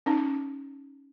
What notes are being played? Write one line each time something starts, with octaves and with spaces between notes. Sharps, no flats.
C#4 D#4